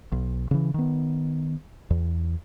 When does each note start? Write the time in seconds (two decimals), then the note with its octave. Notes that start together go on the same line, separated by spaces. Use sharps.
0.12 B1
0.51 C#3 E3
0.74 D#3 B3
1.90 E2